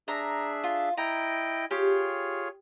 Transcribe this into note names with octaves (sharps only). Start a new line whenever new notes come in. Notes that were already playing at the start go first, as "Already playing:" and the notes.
D4 G#4 E5 A#5
F4
E4 D#5 G5 A#5
F4 G4 G#4 C#5